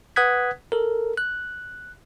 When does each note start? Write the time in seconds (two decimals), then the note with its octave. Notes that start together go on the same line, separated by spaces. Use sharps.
0.16 B4 F#5 D#6 F#6 G#6 B6
0.72 A4 A#4
1.17 F#6